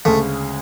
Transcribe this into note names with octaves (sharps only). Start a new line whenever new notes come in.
D2 C#3 G#3 A3 C#4